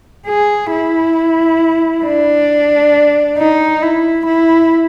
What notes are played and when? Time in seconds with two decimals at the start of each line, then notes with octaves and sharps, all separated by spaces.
0.27 G#4
0.71 E4
2.05 D4
3.38 D#4
3.82 E4
4.26 E4